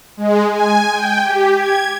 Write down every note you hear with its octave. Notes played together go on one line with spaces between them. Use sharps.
G#3
G#5
G5
G4
G#6